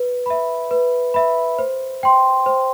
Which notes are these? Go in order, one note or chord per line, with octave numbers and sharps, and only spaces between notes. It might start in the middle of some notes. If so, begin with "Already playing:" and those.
Already playing: B4
E5 B5
B4
E5 B5
C5
G5 C6
C5